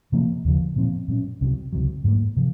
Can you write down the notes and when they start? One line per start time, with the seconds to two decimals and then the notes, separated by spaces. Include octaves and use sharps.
0.12 C3 F3 A#3
0.45 D#2 C#3 F3
0.76 A#2 F3 C4
1.08 A#2 F#3 C#4
1.41 C2 C3 F#3
1.73 C#2 C3 F#3
2.04 G#2 F#3 A#3
2.36 C3 F3